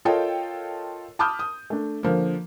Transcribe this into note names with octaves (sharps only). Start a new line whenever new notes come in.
F4 A4 A#4 C#5 D#5 G5
A5 B5 D6 D#6 F6 G6
D#6
A3 D4
D3 F3 A#3